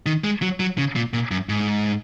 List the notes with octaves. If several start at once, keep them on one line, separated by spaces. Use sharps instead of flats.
D#3
G#3
F#3
F#3
C#3
A#2
A#2
F#2
G#2